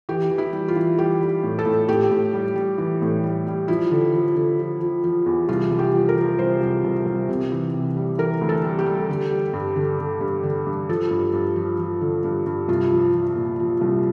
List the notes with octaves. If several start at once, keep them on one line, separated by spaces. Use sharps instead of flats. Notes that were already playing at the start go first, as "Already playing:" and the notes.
E3 G4
E3
E4
G3
F4
E3
G3 G4
G3
A2
A4
A2
A2 G4
A2
G3
G3
E3
A2
G3
G3
F3 E4
D3
F3
D3
F3
F3
F3
E2
C2 F4
C2
G4
F3
A#4
F3
C2 C5
C2
C2
C2
C3
E3
C3
G3
E3 A#4
D2
A4
G3
G4
G3
D3
G3
G2
D3
D3
G2
D3
G2
F3 A4
G2
G2
F3
F3
D3
G2
G2
C2 F4
F3
F3
A#2
F3
C2